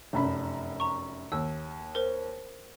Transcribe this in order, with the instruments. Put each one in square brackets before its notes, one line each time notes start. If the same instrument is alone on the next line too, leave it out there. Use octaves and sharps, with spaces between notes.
[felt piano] F1 F#2 B5
[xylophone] A#5 C#6
[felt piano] D#2 [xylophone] E6
[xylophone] A#4 C5